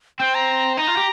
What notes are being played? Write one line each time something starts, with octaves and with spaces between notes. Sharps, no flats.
C4 G5
A#5
D#4 A#5
F4
G4